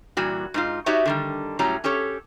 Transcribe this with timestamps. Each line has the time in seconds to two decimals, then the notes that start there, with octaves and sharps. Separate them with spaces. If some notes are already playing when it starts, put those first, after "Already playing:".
0.17 A#2 E3 G3 F#4
0.54 G#2 D#4 F4
0.86 D#4 F#4 G4 C#5 D5 E5
1.06 D3 D#3 G3
1.59 A2 F#3 G3 C#4 A#5
1.84 C#4 G4 A4 C#5